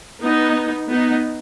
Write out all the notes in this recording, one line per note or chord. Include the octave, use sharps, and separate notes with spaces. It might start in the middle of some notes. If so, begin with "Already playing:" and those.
B3 D#4
B3 D#4